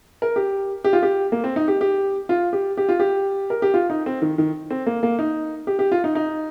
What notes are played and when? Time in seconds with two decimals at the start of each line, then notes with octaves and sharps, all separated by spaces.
0.22 A#4
0.36 G4
0.84 G4
0.93 F4
1.03 G4
1.32 A#3
1.44 C4
1.56 D#4
1.68 G4
1.81 G4
2.29 F4
2.53 G4
2.77 G4
2.89 F4
3.00 G4
3.50 A#4
3.62 G4
3.74 F4
3.90 D#4
4.06 C4
4.22 D#3
4.38 D#3
4.71 C4
4.86 A#3
5.03 A#3
5.19 D#4
5.67 G4
5.79 G4
5.92 F4
6.04 D#4
6.15 D#4